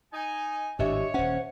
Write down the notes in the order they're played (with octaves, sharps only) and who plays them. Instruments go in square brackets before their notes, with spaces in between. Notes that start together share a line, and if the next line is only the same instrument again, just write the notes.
[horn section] D#4 G#5
[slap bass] G#1 A2 [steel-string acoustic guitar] D4 D#5 E5 [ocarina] G4 [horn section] C#5
[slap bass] D#1 C#4 [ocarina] C5 [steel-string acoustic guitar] F#5